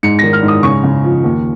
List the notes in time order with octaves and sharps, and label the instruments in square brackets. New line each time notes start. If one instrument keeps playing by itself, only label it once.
[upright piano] G#2 C#7
D#3 A#6
F6
G#2
D#6
C#3 C#6
C#3
F3
D#2